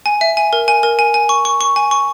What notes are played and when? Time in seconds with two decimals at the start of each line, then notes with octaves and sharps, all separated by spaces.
0.06 G#5
0.21 E5
0.37 G#5
0.53 A#4
0.68 G#5
0.83 A#4
0.99 G#5
1.14 G#5
1.29 C#6
1.45 C#6
1.61 C#6
1.76 G#5
1.91 C#6